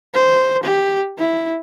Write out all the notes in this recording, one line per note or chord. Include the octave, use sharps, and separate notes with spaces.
C5
G4
E4